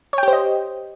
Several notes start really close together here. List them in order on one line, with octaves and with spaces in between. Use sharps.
C#5 G5 G4 C5 D#5